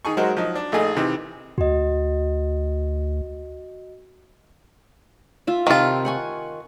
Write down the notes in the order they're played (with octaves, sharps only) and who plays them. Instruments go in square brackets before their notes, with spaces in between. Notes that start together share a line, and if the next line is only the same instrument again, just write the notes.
[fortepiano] D#3 G#4 G#5 C#6
F#3 G#3 F#4 A#4 C5
F3 F#3 D#4
D4
A#1 A3 D#4 G#4 G#5 D#6
C3 D#3 E3
[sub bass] D2 [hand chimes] F#4 D#5
[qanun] F4 E5
[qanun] C3 A5 [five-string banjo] D#3 F4
[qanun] F#5 G#5 C#6